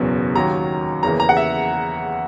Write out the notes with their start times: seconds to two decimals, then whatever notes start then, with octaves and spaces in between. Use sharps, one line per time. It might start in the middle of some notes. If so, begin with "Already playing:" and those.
Already playing: F#1 E2 B2 F#3
0.36 D#2 D#3 F#3 A#5
1.03 E2 C#3 E3 A#3 A#5
1.20 A#5
1.29 F#5
1.37 E5